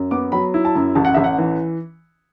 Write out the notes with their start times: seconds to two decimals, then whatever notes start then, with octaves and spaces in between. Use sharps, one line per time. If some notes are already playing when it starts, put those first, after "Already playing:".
Already playing: F#2
0.11 B3 D6
0.32 F#3 B5
0.54 E4
0.65 A5
0.75 F#2
0.95 A1 A5
1.05 F#5
1.14 A1 E5
1.24 F#5
1.38 E3